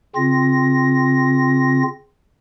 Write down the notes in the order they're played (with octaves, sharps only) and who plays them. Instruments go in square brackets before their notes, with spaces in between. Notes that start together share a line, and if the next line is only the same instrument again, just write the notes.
[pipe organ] C#3 C4 F4 A#6